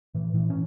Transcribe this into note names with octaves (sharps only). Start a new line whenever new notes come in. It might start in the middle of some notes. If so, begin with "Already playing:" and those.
A2 E3
A2 E3
C#4